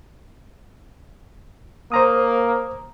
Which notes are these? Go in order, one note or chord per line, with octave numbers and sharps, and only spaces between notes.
A#3 C5 A#5 D#6